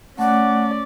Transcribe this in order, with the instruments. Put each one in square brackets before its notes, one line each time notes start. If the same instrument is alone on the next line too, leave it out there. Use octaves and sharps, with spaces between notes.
[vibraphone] A3 [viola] C#4 D5 [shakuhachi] F#5